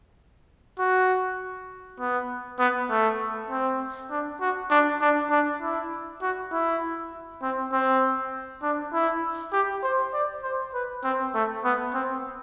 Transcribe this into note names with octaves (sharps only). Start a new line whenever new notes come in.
F#4
B3
B3
A3
C4
D4
F#4
D4
D4
D4
E4
F#4
E4
C4
C4
D4
E4
G4
C5
D5
C5
B4
C4
A3
B3
C4